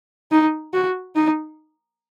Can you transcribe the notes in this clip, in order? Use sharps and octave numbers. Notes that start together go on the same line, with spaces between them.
D#4
F#4
D#4